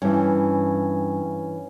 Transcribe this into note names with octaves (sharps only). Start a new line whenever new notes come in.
G2 E3 C#4 C#5